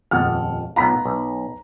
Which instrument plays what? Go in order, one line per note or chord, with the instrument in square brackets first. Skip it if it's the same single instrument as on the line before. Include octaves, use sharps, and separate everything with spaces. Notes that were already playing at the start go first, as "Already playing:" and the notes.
[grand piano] D#1 F#5 F6 [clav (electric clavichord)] F2 G#3 A5
[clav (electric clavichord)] B1 B3 F4 [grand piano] A#5 B5 B6
[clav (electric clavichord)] B1